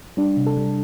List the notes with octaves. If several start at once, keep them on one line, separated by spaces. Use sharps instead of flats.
G3 D4
C3
A4
G3